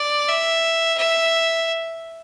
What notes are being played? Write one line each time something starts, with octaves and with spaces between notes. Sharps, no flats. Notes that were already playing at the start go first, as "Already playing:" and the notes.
Already playing: D5
E5
E5